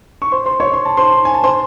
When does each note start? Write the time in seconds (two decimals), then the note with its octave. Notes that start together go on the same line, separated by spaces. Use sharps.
0.22 C#6
0.32 C5 C6
0.46 C5 C6
0.60 C#5 C#6
0.74 C6
0.85 A5
0.97 C5 C6
1.25 G#5
1.34 A5
1.44 C5 C6